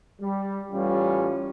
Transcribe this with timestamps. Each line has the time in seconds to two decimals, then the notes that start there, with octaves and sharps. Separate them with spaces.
0.21 G3
0.72 A1 G3 C#4 F4